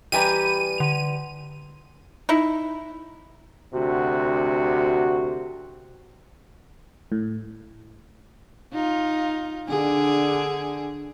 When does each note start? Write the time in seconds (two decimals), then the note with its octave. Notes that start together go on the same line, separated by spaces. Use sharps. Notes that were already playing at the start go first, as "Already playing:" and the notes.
0.12 E3 G3 G4 B4 G#5 A#5 D#7
0.78 D3 F7
2.29 D#4 E4
3.74 D2 C3 F#4
7.12 A2
8.74 D#4 F4
9.68 D3 D4 G#4